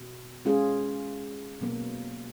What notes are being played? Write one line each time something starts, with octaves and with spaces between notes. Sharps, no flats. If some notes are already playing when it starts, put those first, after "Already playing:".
Already playing: B2
G#3 C#4 F4 G#4
B2 F#3 A#3